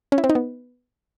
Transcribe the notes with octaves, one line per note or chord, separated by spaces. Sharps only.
C#4
E4
C4
D#4
B3